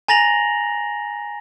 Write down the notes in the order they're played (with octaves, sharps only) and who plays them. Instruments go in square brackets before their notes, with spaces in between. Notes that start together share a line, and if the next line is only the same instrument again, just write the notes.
[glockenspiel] G#5 A#5 A6 A#6 F7 F#7